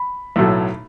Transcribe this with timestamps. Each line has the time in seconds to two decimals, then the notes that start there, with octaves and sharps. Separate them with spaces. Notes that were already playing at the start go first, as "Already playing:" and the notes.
Already playing: B5
0.36 B1 A2 F#3 A3